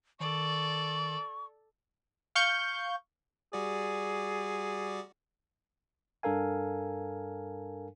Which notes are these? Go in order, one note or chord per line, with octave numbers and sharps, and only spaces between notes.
D#3 A4 D5 C#6
F5 C#6 G6
G3 F#4 G#4 D5
G2 D4 A4 A#4 F5 G#5